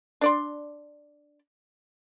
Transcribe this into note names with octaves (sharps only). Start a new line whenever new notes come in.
D4 D5 C6